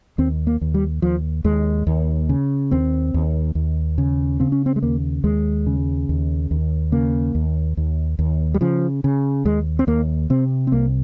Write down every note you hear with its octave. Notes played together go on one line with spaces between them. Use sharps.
D#2 C4
A#3
D#2
G3
D#2 F3
D#2 G#3
D#2
C#3
D#2 C4
D#2
D#2
C#3
C#3 C4
C#4
C4
G#3
D#2 A#3
D#2 G#3
C#3
D#2
D#2
C#3 A#3
D#2
D#2
D#2
G3
C#3 F3
C#3
D#2 G#3
C4
D#2 A#3
C3 C4
C4
C2 A#3